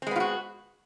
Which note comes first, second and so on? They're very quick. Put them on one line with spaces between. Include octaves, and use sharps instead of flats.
C4 G#3 B3 F4 F#4